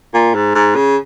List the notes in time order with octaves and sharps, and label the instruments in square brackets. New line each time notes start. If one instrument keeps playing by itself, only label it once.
[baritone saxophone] A#2
G#2
G#2
C#3